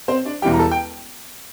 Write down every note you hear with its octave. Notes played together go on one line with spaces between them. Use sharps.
C4 C5
D4 D5
E1 E2 E3 G3 G4 G5
A#5
A4 A5
G5